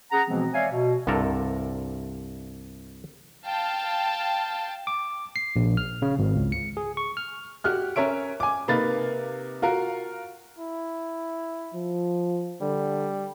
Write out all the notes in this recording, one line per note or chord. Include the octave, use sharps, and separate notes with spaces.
C#4 G#4 F#5 A#5
B2 E3 F3 G#3 B3 C4
C#5 D5 E5 F5 G#5
B2
C2 G2 C3 A4 A#4
F5 G5 A5
D6
C7
A#1
F6
C#3
G#1
C#2
C#7
G#4
C#6
F6
F#4 G4 F6 F#6
C#4 A#4 C#5 E5 D7
G#5 D6
C3 A#3 D#4 B4 F5 A6
F4 F#4 A#4 F5
E4
F3
D3 G3